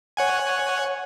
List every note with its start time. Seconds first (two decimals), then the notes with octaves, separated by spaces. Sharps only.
0.17 C#5 F#5 G#5